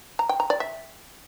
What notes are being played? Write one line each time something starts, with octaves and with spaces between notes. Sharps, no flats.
A#5
G5
A#5
D5
E5